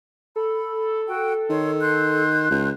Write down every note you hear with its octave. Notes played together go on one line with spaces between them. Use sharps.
A4 B5
F#4 G5
D#3 C#5 C6
C6 F#6 G6
C#2